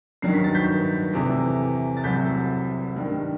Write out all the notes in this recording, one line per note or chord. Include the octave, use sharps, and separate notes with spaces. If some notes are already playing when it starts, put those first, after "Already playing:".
G2 D#3 F#3 C7
B6
A6
G6 B6
E2 C3 E3 A3
A6
C2 C3 F#3 A3 G6 B6
G2 D#3 G3